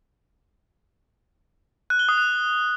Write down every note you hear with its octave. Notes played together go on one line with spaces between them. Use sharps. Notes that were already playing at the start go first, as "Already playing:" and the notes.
F#6
G7
D#6
F#6